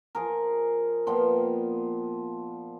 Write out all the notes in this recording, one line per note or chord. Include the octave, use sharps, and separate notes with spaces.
F3 G#4 A#4
A#2 F3 B3 G5